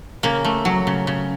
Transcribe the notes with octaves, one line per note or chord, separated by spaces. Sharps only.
C#3 A#3
A3
F#3
C#3
C#3